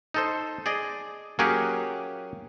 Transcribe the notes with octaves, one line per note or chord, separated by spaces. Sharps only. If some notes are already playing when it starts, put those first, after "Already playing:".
D#4 A4 C5
G#4 D5 D#5
F#3 A#3 C#4 G4 G#4 F#5